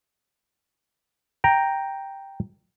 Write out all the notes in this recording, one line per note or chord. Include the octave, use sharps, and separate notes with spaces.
G5 A#5